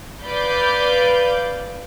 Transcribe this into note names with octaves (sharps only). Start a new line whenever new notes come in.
B4 D5 F5 B5 D6 G6